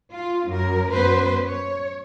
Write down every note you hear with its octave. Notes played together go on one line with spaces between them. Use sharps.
F4
F#2 A#4
F#2 B3 B4 C5
C#5